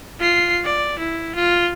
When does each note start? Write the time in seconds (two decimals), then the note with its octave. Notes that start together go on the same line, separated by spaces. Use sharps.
0.20 F4 C7
0.65 D5
0.99 E4
1.35 F4